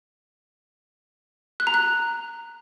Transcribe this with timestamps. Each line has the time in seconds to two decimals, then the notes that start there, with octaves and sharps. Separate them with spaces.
1.60 F#6
1.67 A#5
1.74 F#6